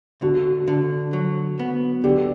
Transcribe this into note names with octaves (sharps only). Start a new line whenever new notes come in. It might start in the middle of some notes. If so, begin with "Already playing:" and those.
D3 F#4
D3
F#3
B3
D3 G4